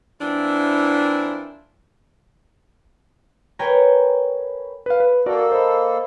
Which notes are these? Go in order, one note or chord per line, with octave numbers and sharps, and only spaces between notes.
E3 A#3 C4 D4 E4 F4
A#4 B4 C#5 G5 G#5 A#5
B4 F5
B4
A#3 F#4 A4 A#4 D5
C5 D#5 B5